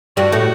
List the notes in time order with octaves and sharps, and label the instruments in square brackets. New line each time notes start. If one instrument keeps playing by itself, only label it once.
[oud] G2 G3 [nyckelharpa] F#4
[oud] A2 A3